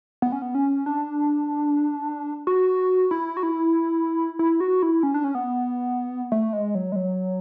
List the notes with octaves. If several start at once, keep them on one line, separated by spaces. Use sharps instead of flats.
B3
C#4
B3
C#4
D4
F#4
E4
F#4
E4
E4
F#4
E4
C#4
D4
C#4
B3
A3
G#3
F#3
G#3
F#3